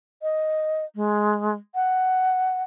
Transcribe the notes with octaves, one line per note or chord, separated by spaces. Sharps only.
D#5
G#3
F#5